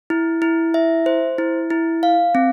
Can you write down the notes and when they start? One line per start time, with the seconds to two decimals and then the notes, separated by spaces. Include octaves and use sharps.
0.10 E4
0.42 E4
0.74 E5
1.06 C5
1.38 E4
1.70 E4
2.03 F5
2.35 C4